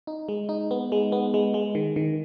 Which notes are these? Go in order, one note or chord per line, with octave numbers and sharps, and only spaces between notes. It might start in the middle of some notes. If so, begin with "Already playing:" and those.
D#4
G#3
D#4
B3
G#3
B3
G#3
G#3
D#3
D#3